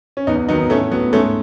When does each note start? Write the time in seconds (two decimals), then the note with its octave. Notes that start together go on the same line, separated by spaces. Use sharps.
0.17 C#4
0.27 E2 B3 D#4
0.48 D#3 F#3 B3 D#4
0.70 A2 A3 C#4
0.91 F#3 B3
1.13 G#2 A3 C#4